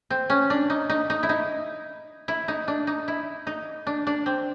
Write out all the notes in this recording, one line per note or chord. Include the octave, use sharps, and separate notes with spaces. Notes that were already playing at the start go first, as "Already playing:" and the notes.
C4
C#4
D4
D#4
D#4
D#4
E4
D#4
E4
D#4
D4
D#4
E4
D#4
D4
D4
C4